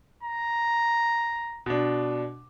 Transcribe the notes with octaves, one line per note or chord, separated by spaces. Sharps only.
A#5
B2 D4